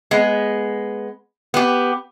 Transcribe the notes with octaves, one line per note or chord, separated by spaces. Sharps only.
G#3 B3
B3 G4